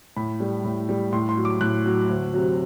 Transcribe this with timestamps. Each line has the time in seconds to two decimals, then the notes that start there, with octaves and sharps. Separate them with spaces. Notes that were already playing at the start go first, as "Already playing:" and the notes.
0.16 A2 B5
0.40 G3
0.64 A2
0.89 G3
1.12 A2 C6
1.29 C6
1.37 F#3
1.45 D6
1.61 A2 F#6
1.86 F#3
2.10 D2
2.33 C3 F#3